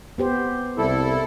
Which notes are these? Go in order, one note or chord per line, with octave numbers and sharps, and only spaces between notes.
B3 G4 C5
C2 E4 A4